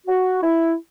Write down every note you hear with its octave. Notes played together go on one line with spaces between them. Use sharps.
F#4
E4